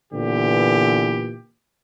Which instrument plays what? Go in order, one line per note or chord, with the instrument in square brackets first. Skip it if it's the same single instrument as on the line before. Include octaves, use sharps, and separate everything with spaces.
[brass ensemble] A#2 D3 E3 B3 G4